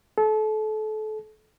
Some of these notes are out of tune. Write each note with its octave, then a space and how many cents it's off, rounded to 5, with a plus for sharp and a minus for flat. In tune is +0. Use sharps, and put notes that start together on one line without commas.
A4 -30